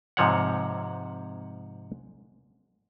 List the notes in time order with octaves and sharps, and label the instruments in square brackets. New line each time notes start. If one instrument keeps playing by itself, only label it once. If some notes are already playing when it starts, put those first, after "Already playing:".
[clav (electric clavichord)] G#2 C3 F3 C#5 F#5